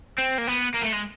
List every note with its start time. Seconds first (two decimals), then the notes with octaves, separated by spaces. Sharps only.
0.18 C4
0.38 A#3
0.47 B3
0.75 A#3
0.84 A3
0.93 G#3